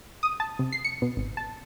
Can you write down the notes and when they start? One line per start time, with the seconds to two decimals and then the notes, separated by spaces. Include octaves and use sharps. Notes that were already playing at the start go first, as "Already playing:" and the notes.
0.23 D#6
0.40 A5
0.59 C3
0.72 C7
0.85 C#7
1.02 B2
1.17 G#1
1.37 A5